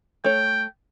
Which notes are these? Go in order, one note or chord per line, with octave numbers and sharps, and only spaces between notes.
A3 C#5 G5